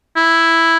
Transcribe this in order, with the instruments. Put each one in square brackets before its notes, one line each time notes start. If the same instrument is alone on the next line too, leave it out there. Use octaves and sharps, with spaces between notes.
[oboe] E4